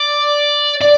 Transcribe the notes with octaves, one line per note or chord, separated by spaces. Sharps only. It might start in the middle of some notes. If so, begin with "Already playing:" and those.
Already playing: D5
D5